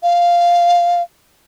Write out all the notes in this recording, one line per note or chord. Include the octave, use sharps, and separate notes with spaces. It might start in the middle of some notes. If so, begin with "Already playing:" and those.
F5